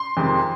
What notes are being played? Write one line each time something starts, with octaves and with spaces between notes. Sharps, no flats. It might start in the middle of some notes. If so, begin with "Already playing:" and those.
Already playing: C6
F2 C3 D#3 G#3